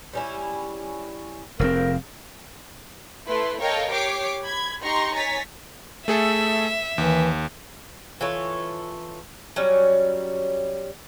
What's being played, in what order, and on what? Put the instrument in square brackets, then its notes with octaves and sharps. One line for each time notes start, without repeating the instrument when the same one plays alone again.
[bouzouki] G3 C#4 E4
[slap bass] F1 C4 [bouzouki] C#3 F3 [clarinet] A#4
[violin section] A3 E4 B4 C6
A4 A#4 C#5 D#5 F5 G5
G4 C#5 D6 C7 D7
B5 G#6
D#4 G4 A#5 C6 C#6
C#5 G#5 A#5 A6 B6
[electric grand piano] A3 G#4 A4 [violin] E5
[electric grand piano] D#2 [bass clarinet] E3
[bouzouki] E3 F4 A4 C#5
F#3 G3 C#4